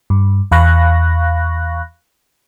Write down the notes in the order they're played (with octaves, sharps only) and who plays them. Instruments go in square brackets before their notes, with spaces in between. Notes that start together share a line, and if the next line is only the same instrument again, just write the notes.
[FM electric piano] G2
E2 F5 B5 C#6 F#6 A#6